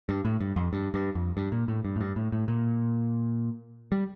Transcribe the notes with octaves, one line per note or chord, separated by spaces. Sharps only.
G2
A2
G2
F2
G2
G2
F2
G2
A#2
A2
G2
A2
G2
A2
A2
A#2
G3